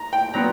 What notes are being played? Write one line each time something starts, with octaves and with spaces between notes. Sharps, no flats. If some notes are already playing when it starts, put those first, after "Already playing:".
Already playing: A#5
G5
A#2 F#3 B3 A#5